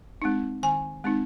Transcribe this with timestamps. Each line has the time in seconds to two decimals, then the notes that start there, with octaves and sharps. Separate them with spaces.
0.22 G#3 C4 D#4
0.63 D#3 G#5
1.04 G#3 C4 D#4